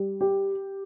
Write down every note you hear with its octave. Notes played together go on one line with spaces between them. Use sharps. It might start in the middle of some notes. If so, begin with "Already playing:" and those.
Already playing: G3
G4